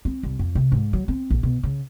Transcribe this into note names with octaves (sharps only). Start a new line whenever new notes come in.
C4
C2
F2
C3
G#2
F#3
C4
A#1
B2
C#3